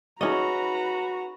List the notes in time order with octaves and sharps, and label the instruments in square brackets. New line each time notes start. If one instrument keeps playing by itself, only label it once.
[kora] C#4 D#5 [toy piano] D#4 G#4 E5 [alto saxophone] F#4 [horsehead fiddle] B4 A#5